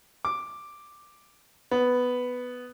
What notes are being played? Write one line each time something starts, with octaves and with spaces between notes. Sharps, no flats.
D6
B3